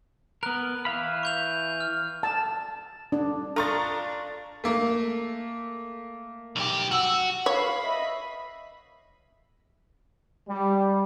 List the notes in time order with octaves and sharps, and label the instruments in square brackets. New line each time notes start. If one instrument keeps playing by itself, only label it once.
[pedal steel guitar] B3 A#4 [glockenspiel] F#6
[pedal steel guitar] E3 F5 B5
[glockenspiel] C#6 G6 F7
F6
[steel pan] A5
D4
[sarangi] D4 [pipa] F4 [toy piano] A4 [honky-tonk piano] A#5 C#6 A6
[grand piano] A3 A#3
[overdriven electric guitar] B1 G4
[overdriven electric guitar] F#4 [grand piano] E6
[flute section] B4 F5 [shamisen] C#5 [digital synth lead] B5
[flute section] D#5 E5
[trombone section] G3